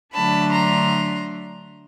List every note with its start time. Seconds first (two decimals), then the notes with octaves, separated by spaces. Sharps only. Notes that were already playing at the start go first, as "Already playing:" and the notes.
0.14 D3 F#3 A3 D4 A5 B5
0.52 A#5 C6